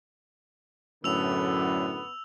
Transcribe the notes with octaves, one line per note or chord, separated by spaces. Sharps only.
F#2 A2 D3 B3 E6 F7